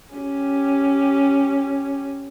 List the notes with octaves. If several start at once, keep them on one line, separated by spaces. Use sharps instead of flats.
C#4 G4